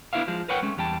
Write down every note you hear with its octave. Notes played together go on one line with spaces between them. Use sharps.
B3 D4 E4 C#5 E5 F5
F3 G#3
A#4 B4 C#5 F#5 G5
G#3 A3 C#4
E2 G3 G5 A5